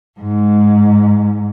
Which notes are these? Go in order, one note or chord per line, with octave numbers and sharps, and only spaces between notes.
G#2